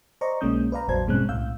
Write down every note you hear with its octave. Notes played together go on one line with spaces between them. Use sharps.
C5 D5 D#5 A#5 C#6
B1 G#3 A#3 C#4 D#6 G6
B4 D5 F5 A#5
A1 E2 F#3 C5 A5 G#6
G2 B2 G#3 C4 C#4 F#6
C2 A2 F5 E6 G6